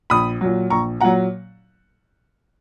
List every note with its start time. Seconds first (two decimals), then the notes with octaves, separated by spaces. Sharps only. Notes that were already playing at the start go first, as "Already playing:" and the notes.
0.10 A#1 B5 D#6
0.41 A#2 F#3
0.70 A#1 A#5 C#6
1.01 A#2 F#3 F#5 A#5